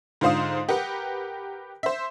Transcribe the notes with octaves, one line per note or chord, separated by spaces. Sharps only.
G#2 D3 F4 C5 F5 D#6
G4 A#4 B4 F#5
C5 E5